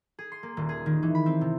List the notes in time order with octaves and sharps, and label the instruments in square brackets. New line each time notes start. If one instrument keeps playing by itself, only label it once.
[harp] G#4
C6
A#3
D#1
G#4
D#3
E3
B5
C4
C3